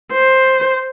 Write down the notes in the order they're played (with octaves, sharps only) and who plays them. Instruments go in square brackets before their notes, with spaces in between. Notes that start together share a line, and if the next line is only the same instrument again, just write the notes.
[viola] C5